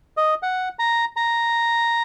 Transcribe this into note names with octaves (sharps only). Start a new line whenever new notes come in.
D#5
F#5
A#5
A#5